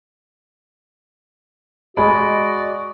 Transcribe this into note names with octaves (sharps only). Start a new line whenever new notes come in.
G#3 F#4 D5 D#5 B5